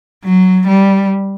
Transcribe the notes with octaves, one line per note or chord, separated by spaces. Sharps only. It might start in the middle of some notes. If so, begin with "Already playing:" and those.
F#3
G3